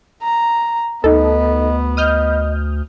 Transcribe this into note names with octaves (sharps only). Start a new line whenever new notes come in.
A#5
D2 B3 D#4 A4 D#5
D#5 D#6 F6 G6